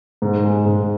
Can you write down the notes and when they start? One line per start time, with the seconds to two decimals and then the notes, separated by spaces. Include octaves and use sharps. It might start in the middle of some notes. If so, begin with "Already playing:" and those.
0.22 G#2
0.44 G#3
0.66 G#2